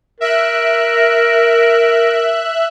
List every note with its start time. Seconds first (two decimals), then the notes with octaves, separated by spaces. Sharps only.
0.21 A#4 E5 F#6